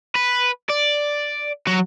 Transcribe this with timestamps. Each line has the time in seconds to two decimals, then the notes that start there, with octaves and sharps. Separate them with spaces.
0.15 B4
0.70 D5
1.67 F#3 F#4